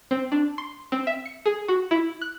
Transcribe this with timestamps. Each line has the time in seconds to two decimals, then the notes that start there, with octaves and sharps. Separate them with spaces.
0.11 C4
0.32 D4
0.58 C6
0.92 C4
1.07 E5
1.26 C#7
1.46 G#4
1.68 F#4
1.91 E4
2.21 F#6